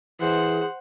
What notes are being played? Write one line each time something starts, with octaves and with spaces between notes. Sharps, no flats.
E3 G#4 C5 F#5